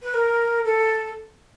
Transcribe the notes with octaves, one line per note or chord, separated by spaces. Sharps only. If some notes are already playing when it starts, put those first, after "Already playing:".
B4
A#4
A4